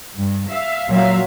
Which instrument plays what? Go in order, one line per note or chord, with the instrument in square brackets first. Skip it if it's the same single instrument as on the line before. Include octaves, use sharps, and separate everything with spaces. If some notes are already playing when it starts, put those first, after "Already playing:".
[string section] G2
E5 F5
[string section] A#2 E5 F5 [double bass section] F#3